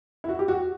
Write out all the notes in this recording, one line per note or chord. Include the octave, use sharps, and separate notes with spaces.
E4
F#4
G4
F#4